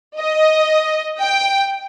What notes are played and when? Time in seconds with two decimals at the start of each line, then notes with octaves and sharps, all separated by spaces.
0.19 D#5
1.20 G5